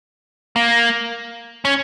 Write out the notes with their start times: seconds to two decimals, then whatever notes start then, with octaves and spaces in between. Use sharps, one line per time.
0.56 A#3
1.65 C#4